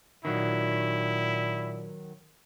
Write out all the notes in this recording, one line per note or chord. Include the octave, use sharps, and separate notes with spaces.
A#2 D#3 F#3 E4